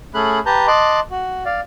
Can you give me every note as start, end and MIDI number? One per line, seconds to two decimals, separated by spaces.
0.14 0.40 57
0.14 0.40 61
0.14 0.40 68
0.14 0.40 83
0.14 0.40 90
0.46 0.67 67
0.46 0.67 71
0.46 0.67 81
0.46 0.67 82
0.46 0.67 91
0.68 1.00 75
0.68 1.00 81
0.68 1.00 84
0.68 1.00 86
0.68 1.00 90
1.11 1.44 66
1.45 1.61 74
1.45 1.61 77